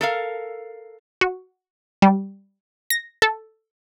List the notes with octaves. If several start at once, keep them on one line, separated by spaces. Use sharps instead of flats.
A4 A#4 F5
F#4
G3
A#6
A4